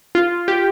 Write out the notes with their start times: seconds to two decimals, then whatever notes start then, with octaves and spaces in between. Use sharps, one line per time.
0.15 F4
0.48 G4